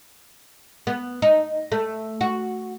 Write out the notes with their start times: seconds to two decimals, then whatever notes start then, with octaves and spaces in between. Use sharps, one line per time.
0.87 B3
1.22 D#4
1.72 A3
2.21 F#4